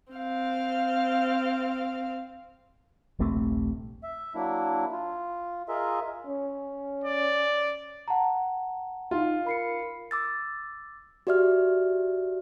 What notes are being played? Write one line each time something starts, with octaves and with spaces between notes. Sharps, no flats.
C4 F5
D#1 A#1 C3 A3
E5
F#3 A#3 D4 E4
F4
F4 G#4 A#4 D#5 E5
C#4
D5
F#5 A5 A#5
D#4 F4
A#4 B5 C7 C#7
D6 E6 A6
F#4 G4 D5 E5 F6